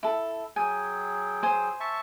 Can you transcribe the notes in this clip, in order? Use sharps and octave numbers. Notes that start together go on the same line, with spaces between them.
E4 A4
F#3 G#4 G5 G#5
C5 G#5
E5 A5 C#6